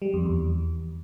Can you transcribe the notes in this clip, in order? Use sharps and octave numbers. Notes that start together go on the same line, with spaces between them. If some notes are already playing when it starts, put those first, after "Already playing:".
G3
F2
E2